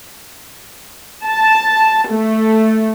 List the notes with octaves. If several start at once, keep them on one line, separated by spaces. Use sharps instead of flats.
A5
A3